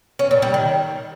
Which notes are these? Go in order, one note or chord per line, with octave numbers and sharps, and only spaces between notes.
C#4
A#2
G3
D#3